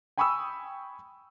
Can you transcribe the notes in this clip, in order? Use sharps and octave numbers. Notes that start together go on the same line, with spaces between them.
G5 G#5 B5 C#6 D#6 E6